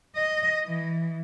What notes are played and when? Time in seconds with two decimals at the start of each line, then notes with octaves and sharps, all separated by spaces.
0.16 D#5
0.66 E3